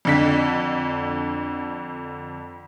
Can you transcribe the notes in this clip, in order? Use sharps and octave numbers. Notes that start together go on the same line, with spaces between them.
F2 D3 B6